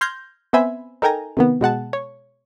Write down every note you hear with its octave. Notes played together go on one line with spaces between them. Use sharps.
C6 F6 G6 G#6 A#6
B3 C4 C5 E5 G#5 B5
D#4 A4 A#4 G5 G#5 A#5
C3 D#3 B3
B2 G#3 F#5 A5
C#5